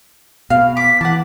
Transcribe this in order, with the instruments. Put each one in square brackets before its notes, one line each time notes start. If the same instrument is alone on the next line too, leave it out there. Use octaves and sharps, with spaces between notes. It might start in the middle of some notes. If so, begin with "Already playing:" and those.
[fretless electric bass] B2 [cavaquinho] F5
[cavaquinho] D6 [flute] B6
[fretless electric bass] E3 [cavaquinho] F#5 A5 [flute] D6